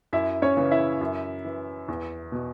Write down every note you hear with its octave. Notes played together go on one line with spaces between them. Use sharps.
F#2 E4 E5
C#4 C#5
C#3 E3
E4 E5
F#2
E3
E2
B2